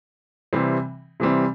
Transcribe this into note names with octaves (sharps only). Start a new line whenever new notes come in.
C3 E3 G3 C4
C3 E3 G3 C4